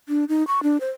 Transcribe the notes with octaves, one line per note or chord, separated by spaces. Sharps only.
D4
D#4
C#6
D4
C5